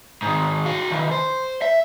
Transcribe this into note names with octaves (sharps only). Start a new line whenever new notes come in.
G#2 D#3
F#4 F5
D#3 E3
C5
E5